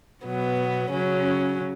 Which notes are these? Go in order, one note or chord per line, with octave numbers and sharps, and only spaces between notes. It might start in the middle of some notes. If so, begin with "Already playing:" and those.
B2 F#3 B3
C#3 F#3 C#4